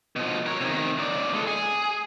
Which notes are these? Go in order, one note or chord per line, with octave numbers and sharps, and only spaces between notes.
B2 F3
A#4 C#5
C3 D#3
C#2 D5
G#3 A4
G#4